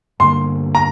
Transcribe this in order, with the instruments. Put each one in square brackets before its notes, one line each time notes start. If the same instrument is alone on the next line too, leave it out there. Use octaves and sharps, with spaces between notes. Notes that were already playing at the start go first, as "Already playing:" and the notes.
[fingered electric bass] G2 D3 A#3 [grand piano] C6
[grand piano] A#5